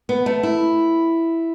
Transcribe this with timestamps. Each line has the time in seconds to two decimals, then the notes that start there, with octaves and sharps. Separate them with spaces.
0.09 B3
0.26 A3
0.43 E4